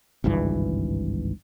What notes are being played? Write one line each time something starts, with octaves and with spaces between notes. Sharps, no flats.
G#1 C#2 G2 E3